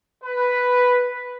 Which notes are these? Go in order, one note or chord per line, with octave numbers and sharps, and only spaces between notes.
B4